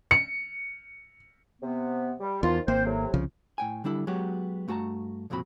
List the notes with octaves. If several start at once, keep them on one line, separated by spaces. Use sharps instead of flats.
C#7
C3 B3
G3
E2 D#3 F3 F4
G#1 A#3 C4 C5
A2 C3 F#3
C2 C#3 F3
A2 G5 G#5
D3 G3 D4 E4 A4
F#3 G#3 B3 F#4 G4
G2 A3 F#4 B4 A5 A#5
C2 F2 A#2 C4 F#4 B5